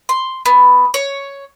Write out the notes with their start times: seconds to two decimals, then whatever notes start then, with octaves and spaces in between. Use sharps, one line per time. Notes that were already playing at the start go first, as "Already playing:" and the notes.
0.09 C6
0.46 B3
0.94 C#5